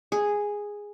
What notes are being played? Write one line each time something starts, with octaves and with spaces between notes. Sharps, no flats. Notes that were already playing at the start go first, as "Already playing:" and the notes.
G#4